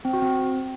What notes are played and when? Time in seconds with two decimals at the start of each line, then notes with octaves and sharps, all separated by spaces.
0.05 C4
0.13 F#4
0.22 C4